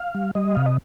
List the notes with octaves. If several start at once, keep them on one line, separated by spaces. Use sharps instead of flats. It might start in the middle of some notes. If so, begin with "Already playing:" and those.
Already playing: F5
G3
G3 D#5
C3 F5
D#5